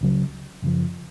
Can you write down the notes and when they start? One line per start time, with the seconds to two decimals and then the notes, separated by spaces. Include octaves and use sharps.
0.01 C#2 C#3 F#3
0.62 F#2 C#3 F3